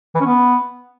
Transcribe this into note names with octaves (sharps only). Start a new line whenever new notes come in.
E3
C#4
B3